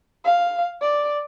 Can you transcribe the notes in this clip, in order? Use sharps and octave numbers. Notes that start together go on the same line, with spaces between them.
F5
D5